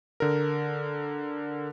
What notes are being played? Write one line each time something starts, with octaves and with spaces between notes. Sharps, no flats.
D3 A#4